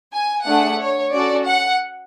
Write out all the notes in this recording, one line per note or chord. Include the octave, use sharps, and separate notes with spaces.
G#5
A3 D4 G#4 F#5
C#5
C#4 F#4 A4 D5
F#5